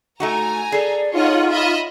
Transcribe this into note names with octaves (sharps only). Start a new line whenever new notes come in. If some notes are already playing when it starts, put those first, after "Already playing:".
A3 D#4 F#4 G#5 A#5
G#4 A4 D5
D#4 F4 C#5 D#5 F#5
D#5 E5 B5